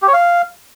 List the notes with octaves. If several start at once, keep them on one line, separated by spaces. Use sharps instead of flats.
G4
C#5
F5